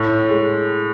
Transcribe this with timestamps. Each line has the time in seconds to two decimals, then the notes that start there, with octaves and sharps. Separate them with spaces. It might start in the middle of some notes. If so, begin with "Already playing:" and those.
Already playing: A2
0.29 G#3